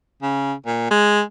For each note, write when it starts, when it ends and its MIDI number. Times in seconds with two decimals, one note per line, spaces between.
0.22 0.53 49
0.66 0.88 46
0.91 1.21 56